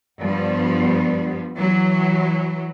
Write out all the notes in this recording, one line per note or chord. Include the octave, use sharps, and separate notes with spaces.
G2 F3 G3 B3
E3 F#3